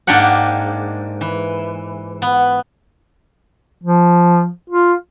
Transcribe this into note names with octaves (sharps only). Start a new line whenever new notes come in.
G#2 A#3 D4 G4 F#5
E3
B3
F3
F4